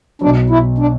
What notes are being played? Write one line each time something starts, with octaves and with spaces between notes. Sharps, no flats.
B1 B2 F#3 D4
E4
D4